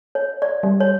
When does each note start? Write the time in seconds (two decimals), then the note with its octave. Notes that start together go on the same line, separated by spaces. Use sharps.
0.15 C#5
0.42 D5
0.63 G3
0.80 C#5